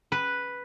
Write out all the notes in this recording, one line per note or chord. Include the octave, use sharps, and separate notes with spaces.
B4